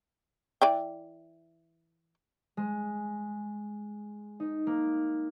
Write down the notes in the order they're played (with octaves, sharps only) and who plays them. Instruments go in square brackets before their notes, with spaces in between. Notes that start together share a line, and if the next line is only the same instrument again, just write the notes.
[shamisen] E3 D5 G5
[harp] G#3
D#4
A#3